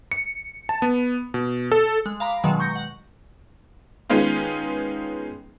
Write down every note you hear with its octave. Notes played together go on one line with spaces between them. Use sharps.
C#7
A5
B3
B2
A4
G#3
F5 A#5 B5 D6
B2 D#3 F#3 G#3
C#6 G6 A#6 C#7
F#5
D#3 G#3 B3 C#4 D#4 F4